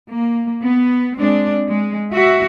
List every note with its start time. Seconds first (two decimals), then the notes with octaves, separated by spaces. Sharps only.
0.10 A#3
0.63 B3
1.17 G#3 C4 D4
1.68 G#3
2.13 F#4 E5